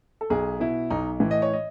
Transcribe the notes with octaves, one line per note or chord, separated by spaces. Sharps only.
A4
B1 G#4
B2 E4
B1 D#4
A2 E3
D#5
C#5
D#5